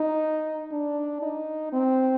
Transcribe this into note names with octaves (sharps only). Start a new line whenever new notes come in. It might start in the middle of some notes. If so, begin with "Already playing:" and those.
Already playing: D#4
D4
D#4
C4